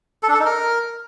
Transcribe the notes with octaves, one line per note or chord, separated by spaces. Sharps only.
A4
D4
A4
D#4
A#4